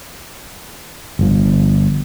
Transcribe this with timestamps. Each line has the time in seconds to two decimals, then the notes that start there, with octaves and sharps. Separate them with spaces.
1.19 G1 F3